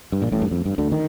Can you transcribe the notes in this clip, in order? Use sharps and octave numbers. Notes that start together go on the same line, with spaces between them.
G2
A#1 A#2
A1 A2
G2
F2
G2
D2 D3
D#3